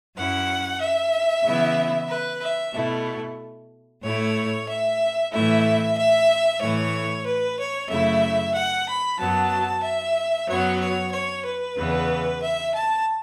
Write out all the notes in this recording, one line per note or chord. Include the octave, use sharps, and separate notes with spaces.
F#2 F#3 C#4 E4 F#5
E5
C#3 E3 B3 E4
B4
E5
B2 A3 E4
A2 A3 E4 C#5
E5
A2 E3 A3 E4 E5
E5
A2 E3 A3 E4 C#5
B4
C#5
F#2 C#3 A3 E4 E5
F#5
B5
F#2 F#3 B3 A5
E5
F#2 F#3 B3 C#5
C#5
C#5
B4
E2 C#3 E3 B3
E5
A5